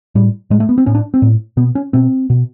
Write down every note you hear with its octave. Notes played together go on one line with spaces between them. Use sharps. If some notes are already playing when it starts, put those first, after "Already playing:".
A2 G3
A2 G#3
A3
B3
C4
A2 C#4
D4
C4
A2
B2 B3
C#4
B2 C4
B2